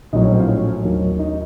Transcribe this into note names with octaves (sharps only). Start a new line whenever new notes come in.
A#1 A2 F#3 D#4 D#5
C#4 C#5
C4 C5
F4 F5
C#4 C#5
D#2 D#3 F#3
D#4 D#5